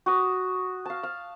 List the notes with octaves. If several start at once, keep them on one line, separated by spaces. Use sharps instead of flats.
F#4 D#6
F5 A5
F5